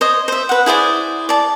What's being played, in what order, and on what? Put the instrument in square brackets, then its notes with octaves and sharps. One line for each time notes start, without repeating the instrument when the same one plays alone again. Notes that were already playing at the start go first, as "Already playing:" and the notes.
[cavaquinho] C5 C#5 D#5
C5 E5
B4 F#5
E4 G#4 C5 D5
D5 A5